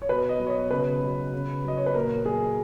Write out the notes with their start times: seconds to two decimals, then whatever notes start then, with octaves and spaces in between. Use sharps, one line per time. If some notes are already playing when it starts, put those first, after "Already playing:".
0.02 C#5
0.09 B2 B4
0.29 D#5
0.39 F#3
0.47 C#5
0.50 D#5
0.71 C#3 B4
1.02 F#3
1.33 C#3
1.64 F#3 D#5
1.77 C#5
1.86 B4
1.94 A#2 A#4
2.25 F#3 G#4